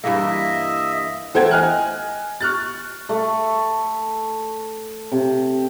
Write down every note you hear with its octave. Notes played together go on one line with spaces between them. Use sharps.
G2 E3 A#3 D#5 E5
E3 A4 C5 F#5 G5 G#6
D#5 G#5 F6 F#6
C#6 F6 F#6 A6
A3
C3